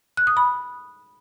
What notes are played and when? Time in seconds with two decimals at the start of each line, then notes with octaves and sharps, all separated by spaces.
0.17 F#6
0.27 D#6
0.37 B5